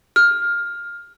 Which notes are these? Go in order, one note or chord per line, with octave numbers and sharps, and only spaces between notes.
F6